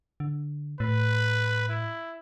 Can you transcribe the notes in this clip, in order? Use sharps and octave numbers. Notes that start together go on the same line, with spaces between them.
D3
A2 B4
E4